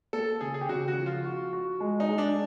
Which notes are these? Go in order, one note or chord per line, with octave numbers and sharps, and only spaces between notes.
A#3 A4
C#3 G#4
G#4
G4
C#3 F#4
F#4
F3
F4
F#4
F#4
G#3
D#4
G#3
D4